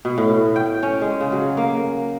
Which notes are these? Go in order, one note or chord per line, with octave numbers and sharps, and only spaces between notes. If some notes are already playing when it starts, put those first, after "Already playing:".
B2
A2
G5
C#4
G#3
C#3
F#3
A#3